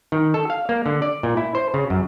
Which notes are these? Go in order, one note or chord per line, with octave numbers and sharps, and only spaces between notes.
D#3
A4
F5
A#3
D3
D5
A#2
E4
C5
C#3
F#2